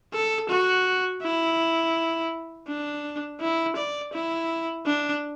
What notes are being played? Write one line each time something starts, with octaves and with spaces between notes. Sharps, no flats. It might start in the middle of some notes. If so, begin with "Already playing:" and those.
A4
F#4
E4
D4
E4
D5
E4
D4